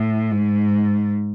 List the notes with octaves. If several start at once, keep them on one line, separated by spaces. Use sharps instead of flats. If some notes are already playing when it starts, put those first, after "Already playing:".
Already playing: A2
G#2